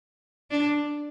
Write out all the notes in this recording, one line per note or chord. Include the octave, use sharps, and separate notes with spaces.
D4